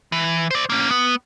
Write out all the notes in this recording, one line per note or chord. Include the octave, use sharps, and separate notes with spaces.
E3
C5 D5
A#3 C#4
B3